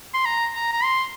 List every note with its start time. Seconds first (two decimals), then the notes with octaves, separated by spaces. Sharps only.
0.14 C6
0.25 A#5
0.55 A#5
0.73 A#5
0.84 C6